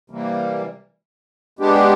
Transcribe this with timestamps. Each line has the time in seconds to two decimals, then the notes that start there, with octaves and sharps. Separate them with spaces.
0.10 C3 E3 G3 A#3
1.59 G#3 B3 D4 G4